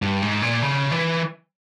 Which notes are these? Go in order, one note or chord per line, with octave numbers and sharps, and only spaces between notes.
G2
G#2
A#2
C#3
E3